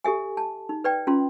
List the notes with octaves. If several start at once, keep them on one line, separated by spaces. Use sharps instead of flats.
G4 A4 E5 G#5
A5
D#4
B4 D5 G5
C#4 F4 A#5 C6